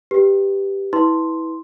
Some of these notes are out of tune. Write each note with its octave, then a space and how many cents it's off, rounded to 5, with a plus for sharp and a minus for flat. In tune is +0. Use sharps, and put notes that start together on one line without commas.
G4 +0 B4 +0
E4 -25 B4 +0 C6 +0